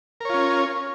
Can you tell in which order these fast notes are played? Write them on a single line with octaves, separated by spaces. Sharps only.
A#4 C#5 F4 C#4